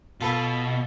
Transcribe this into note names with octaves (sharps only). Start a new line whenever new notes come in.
B2 F4 A4 B4